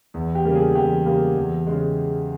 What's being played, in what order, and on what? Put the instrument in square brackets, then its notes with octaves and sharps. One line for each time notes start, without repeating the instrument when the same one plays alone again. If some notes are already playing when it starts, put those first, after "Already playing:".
[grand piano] E2
G4
C#3 G3 A#3
G#4
E2 G4
C#3 G3 A#3
E2
C#3 G#3